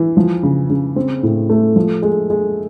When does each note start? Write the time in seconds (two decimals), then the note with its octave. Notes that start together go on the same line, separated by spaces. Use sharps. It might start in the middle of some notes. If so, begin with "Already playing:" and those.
Already playing: E3
0.17 F3
0.43 C#3
0.70 C#3
0.96 C4
1.23 A2
1.50 A3
1.76 F3
2.02 G#3
2.30 G#3